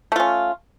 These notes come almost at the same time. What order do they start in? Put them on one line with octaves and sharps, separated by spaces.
A3 F4 C#4